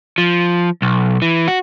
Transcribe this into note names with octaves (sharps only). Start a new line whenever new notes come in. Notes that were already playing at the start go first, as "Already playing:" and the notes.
F3
B1
E3
F#4